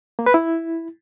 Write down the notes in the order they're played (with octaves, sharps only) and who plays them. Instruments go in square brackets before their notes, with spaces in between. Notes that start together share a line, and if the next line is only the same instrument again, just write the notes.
[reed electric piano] A#3
B4
E4